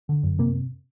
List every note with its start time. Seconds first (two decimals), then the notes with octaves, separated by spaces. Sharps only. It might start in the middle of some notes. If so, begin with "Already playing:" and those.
0.09 D3
0.23 F#2
0.39 C3 A#3